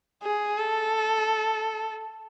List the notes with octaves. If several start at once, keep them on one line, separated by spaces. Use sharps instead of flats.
G#4
A4